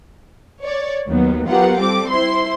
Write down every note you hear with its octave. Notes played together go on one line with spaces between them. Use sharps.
C#5 D5
D#2 D#3 F#3 B3
F#3 B3 F4 G4 A#4 F#5
G3 C4 A4 D6
E4 C5 C6